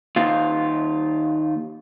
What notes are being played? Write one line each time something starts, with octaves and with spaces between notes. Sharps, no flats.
D#2 F4